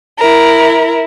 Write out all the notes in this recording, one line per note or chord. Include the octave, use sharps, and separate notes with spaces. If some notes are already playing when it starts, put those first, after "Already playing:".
E4 A#4